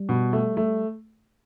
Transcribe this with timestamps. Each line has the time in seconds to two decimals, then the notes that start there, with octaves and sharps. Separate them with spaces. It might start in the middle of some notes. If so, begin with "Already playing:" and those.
Already playing: G3
0.09 B2
0.33 A3
0.57 A3